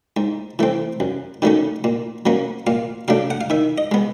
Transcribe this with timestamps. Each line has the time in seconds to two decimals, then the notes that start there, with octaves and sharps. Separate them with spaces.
0.17 G#2
0.59 E3 A3 C4
1.00 F#2
1.42 D#3 F#3 A3 C#4
1.84 A#2
2.26 F#3 A#3 C#4
2.67 A#2 F5
3.08 F#3 A3 D4 F5
3.30 F#5
3.41 F5
3.50 D#3 E5
3.78 D#5
3.92 G#3 B3